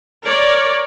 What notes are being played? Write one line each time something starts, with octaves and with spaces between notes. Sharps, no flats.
A#4 C#5 D5